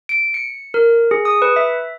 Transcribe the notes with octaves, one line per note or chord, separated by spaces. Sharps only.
D7
C#7
A#4
G#4
D#6
B4
E5